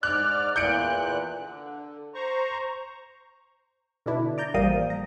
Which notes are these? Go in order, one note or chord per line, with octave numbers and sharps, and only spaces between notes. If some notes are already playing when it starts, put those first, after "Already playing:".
G#2 D5 F6 F#6
E2 A#2 F#6 G6 C#7 D7
D3
C5 A#5 C#6
B2 D3 D4 E4
D5 A#5 G6
A1 F3 G3 A#3 D#6
A#5